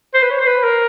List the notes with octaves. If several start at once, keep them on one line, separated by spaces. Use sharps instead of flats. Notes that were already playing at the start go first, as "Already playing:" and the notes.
C5
B4
C#5
C5
B4
A#4